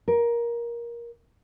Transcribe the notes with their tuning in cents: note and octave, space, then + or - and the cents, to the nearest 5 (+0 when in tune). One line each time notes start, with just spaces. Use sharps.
A#4 +15